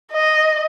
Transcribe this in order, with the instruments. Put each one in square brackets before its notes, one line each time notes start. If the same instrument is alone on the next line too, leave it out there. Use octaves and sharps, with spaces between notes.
[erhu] D#5